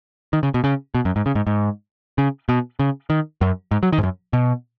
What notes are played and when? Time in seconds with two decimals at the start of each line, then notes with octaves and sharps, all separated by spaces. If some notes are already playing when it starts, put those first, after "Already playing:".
0.33 D#3
0.43 C#3
0.54 B2
0.64 C#3
0.95 B2
1.05 F#2
1.16 G#2
1.26 C#3
1.35 G#2
1.47 G#2
2.18 C#3
2.49 B2
2.80 C#3
3.10 D#3
3.41 F#2
3.71 G#2
3.83 F#3
3.93 D#3
3.98 G#2
4.03 F#2
4.33 B2